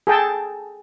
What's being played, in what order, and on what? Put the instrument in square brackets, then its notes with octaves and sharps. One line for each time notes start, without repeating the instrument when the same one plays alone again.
[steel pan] G#4 A4 G5 A5